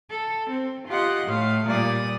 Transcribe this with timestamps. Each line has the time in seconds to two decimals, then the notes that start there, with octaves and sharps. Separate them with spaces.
0.11 A4
0.50 C4
0.88 F4 G4 D#5 F#5 C6
1.26 A2 A3 F5
1.66 A#2 G3 D5 D#6